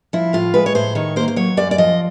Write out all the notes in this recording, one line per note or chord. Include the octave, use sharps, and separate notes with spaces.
F3 E4
A2 F4
G#3 B4
C#5
A2 C5
D#3 C#5
A#3 C5
C5
F#3 C#5
F#2 D5
D5
F3 D#5